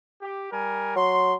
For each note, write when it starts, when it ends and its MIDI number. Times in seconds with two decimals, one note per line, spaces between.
0.21 0.50 67
0.51 0.96 55
0.51 0.96 70
0.51 0.96 80
0.96 1.34 54
0.96 1.34 84